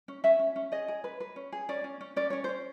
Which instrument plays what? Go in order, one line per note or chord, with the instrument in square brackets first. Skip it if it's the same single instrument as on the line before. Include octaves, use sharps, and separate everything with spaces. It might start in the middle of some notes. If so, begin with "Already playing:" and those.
[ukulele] C#4
C#4 E5
C#4
C#4
G#4 D#5
G#4
B4
B4
C#4
G#4
C#4 D5
C#4
C#4
C#4 D5
C#4 C#5
C#4 C5